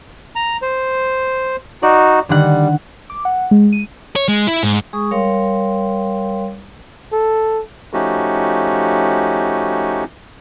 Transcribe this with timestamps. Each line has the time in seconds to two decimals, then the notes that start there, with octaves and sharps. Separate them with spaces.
0.35 A#5
0.62 C5
1.83 D#4 F#4 D5
2.29 D3 D#3 G3 F#5
3.10 D6
3.25 F#5
3.51 G#3
3.73 D#7
4.16 C#5
4.28 G#3
4.47 E4
4.63 G#2
4.93 G#3 G#4 C#6 D#6
5.11 G3 A#4 C#5 F5 G5 C6
7.12 A4
7.93 F3 A3 C#4 D#4 F#4 G4